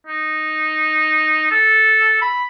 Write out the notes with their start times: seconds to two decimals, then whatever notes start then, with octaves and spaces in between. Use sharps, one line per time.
0.07 D#4
1.51 A4
2.22 B5